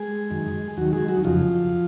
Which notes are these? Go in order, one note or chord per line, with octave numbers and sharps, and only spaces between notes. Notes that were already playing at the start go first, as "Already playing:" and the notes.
Already playing: G#3 G#4
F#2 D#3
D#2 D#3 F#3 F#4
G#3 G#4
F#3 F#4
D#4
F2 C#3 F3 F4